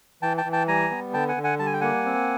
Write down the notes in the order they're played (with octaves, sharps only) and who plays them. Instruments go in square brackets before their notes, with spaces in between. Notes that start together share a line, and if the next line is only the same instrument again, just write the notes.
[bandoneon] E3 G5 A5
G5 A5
E3
G5 A5
G3 G#5 A#5
B3
D3 G5 A5
F#5 G#5
D3
F#5 G#5
G3 A5
G#5
G5
A#3 F#5 G#5
C4